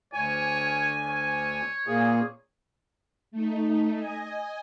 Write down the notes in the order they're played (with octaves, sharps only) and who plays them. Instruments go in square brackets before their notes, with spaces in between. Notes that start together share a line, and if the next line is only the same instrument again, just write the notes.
[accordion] D2 G#5 [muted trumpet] C#5
[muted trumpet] C#5
[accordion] A#2 A#3 G#4
[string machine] A3 D#4
D#5 G#5